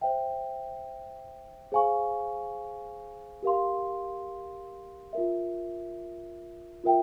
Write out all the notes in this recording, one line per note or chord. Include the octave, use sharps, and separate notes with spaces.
C5 E5 G5
G#4 C5 F5 G#5 C#6
G4 A#4 F5 C6
F4 A#4 E5
F4 A#4 E5 G5